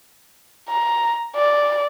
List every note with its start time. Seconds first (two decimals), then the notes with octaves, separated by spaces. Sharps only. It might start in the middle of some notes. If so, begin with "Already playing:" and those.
0.69 A#5
1.36 D5